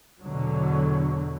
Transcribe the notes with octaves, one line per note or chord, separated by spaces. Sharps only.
E2 B2 D3 F#3